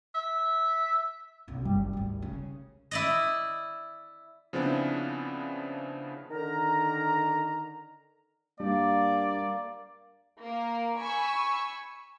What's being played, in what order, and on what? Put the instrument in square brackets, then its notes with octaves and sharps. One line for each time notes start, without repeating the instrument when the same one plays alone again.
[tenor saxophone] E5
[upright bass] B1 C#3
[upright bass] F#1 [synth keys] G3
[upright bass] G#1 D2
C#3
[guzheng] E4 D5 D#5
[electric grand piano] C#3 F3 B3 C4 D4 E4
[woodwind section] D3 D#3 A#4 A#5
[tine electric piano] G3 D4 [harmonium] A#3 [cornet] D5
[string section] A#3 A#4
G#5 B5 C#6 E6